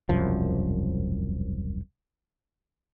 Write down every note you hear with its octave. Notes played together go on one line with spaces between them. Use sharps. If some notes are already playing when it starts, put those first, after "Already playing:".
E1 C2 F#2 F3